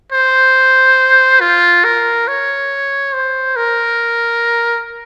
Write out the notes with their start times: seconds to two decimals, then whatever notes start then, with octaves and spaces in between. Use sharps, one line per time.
0.12 C5
1.41 F4
1.84 A#4
2.28 C#5
3.14 C5
3.56 A#4